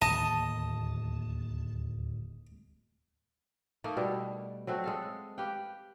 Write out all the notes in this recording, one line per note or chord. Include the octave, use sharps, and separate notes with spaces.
D1 D#2 A#3 D#5 A5
A3 A#3 D#4 F5
B2 G3 E4
F#3 A3 C4 F#4
G#3 A4 F5
G4 B4 F5 G5